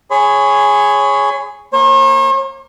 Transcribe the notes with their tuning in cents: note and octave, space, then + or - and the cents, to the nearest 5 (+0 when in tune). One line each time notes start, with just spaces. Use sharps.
G#4 +0 C#5 +0 B5 +45
A#3 +0 C#5 -45